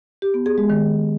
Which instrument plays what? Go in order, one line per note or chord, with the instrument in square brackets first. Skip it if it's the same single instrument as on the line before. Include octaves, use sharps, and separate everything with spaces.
[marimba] G4
B3
G#4
G#3
D#3